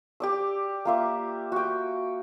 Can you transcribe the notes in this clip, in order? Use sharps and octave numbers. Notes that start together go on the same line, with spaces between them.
G4 D5 E6
A#3 F4 E5
F#4 G5